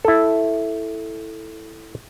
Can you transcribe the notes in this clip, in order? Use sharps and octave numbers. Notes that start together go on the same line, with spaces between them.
E4 A4